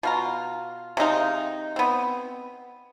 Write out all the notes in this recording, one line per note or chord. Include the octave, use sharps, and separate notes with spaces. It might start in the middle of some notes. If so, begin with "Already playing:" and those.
B2 F4 A#5
C3 G#3 D#4 F5
B3 C4